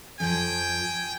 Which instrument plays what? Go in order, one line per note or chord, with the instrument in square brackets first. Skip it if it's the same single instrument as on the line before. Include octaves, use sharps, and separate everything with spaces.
[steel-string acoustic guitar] F2 F3 [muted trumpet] G5 [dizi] G#5